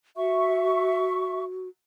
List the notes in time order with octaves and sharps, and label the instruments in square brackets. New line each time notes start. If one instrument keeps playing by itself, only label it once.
[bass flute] F#4 [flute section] E5 C#6